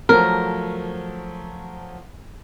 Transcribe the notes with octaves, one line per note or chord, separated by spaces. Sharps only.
F3 F#3 A3 A#4